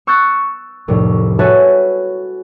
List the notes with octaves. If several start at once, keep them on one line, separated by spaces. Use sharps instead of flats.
C#6 E6 F#6 G6 A6 C#7
F1 C2 A2
F#4 A4 B4 C#5 E5 G#5